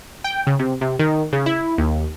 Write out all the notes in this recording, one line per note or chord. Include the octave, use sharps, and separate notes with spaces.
G5
C#3
C3
C3
D#3
C#3
E4
D#2